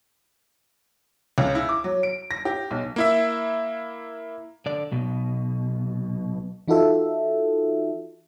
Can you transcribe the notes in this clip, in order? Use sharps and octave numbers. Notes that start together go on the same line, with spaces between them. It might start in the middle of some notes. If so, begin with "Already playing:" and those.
C#2
E4
D6
F#3
D7
A#6
G4
B1
A#3 E4 E5
D3 D5
B1 B2
E3 D#4 F4 F#4 A4 E5